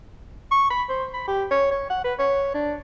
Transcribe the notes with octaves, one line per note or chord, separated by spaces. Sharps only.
C#6
B5
C5
B5
G4
C#5
C#5
F#5
B4
C#5
D4